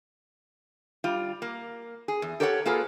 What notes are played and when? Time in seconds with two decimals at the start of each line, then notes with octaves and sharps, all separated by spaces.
1.04 G3 F4
1.42 A#3
2.08 G#4
2.22 E2
2.40 G4 A4 A#4 C#5 E5 F#5
2.66 A#3 F4 G#4 A4 B4